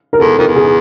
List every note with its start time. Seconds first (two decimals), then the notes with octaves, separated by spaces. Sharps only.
0.13 A#4
0.20 E2 A4
0.38 F2 A#4
0.47 E2
0.56 G#4